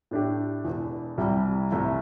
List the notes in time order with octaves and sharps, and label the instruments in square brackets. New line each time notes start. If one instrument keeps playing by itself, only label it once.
[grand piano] A2 A3 D4 G4
E1 E2 E3
C2 C3 G3 E4
C2 C3 A3 E4